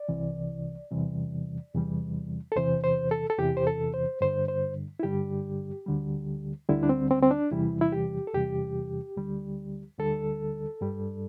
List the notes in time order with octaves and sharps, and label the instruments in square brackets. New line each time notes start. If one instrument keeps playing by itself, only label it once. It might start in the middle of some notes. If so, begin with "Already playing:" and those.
Already playing: [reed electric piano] D5
C2 C3 E3
E2 C3 E3 G3
E2 C3 E3 G3
A4
E2 C3 E3 C5
C5
A4
A4
E2 C3 E3 G4
C5
A4
C5
G2 D3 G3 C5
C5
E4
G2 D3 G3 G4
D2 D3 G3
D2 D3 G3 E4
D4
C4
C4
C4
D4
E2 C3 E3 G3 E4
E4
G4
A4
E2 C3 E3 G3 G4
D2 D3 G3
D2 D3 G3 A4
G2 G3